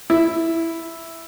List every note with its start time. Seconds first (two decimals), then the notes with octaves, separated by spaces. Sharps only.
0.10 E4